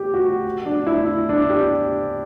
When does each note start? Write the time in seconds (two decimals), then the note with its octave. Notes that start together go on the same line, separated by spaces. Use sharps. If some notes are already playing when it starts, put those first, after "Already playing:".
Already playing: G4
0.14 F#4
0.66 D4
0.87 E4
1.29 D4
1.49 G4